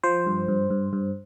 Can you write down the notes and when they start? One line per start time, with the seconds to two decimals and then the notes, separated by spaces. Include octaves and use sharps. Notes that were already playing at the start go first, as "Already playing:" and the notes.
0.04 F3 C5
0.26 G2
0.48 G2
0.70 G2
0.93 G2